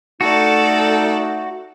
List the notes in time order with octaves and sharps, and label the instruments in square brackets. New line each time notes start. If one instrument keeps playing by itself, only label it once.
[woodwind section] A3 D#4 [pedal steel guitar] F#4 [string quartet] A4 D5